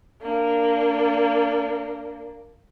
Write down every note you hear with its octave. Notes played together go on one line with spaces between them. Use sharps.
A#3 D4